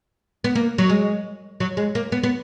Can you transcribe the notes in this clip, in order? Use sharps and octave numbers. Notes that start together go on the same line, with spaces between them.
B3
A#3
F#3
G#3
F#3
G#3
A#3
B3
B3